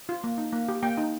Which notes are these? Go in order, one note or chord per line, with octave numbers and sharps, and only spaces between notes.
F4
A#3
D#4
A#3
G4
A#3 G5
D#4